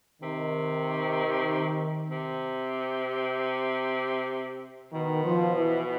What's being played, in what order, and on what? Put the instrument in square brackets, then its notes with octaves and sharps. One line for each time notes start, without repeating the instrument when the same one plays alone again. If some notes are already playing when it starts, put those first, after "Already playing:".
[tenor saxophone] C3 [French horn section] D#3
[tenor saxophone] C3
[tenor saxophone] B2 [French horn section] D#3
[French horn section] F3
E3